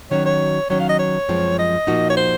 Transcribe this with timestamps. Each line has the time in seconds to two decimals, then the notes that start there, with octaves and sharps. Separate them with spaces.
0.11 D#3 F#3 C#4 F#4 C#5
0.25 C#5
0.70 D#3 F#3 C#4 C#5
0.80 F5
0.89 D#5
0.99 C#5
1.29 F#2 F3 G#3 C4
1.59 D#5
1.87 A#2 F3 A#3 D#4 F#4
2.10 C#5
2.17 C5